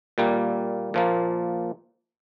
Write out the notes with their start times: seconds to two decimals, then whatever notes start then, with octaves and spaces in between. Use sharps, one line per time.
0.18 A#2 G3 A#3
0.94 A#2 F3 A#3